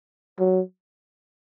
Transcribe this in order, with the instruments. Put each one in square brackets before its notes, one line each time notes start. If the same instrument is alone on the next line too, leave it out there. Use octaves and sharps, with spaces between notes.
[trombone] F#3